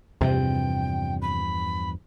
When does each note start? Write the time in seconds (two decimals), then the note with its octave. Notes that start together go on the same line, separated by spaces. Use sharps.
0.21 E2 G2 C3 F3 G5
1.21 B5